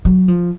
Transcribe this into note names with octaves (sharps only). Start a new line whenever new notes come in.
F#3
F3